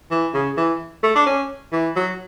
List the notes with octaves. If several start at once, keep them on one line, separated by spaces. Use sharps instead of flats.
E3
C#3
E3
A3
D4
C#4
E3
F#3